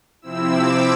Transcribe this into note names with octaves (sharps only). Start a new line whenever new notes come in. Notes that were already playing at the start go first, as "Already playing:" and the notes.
C3 F3 C4 E4 E6
D6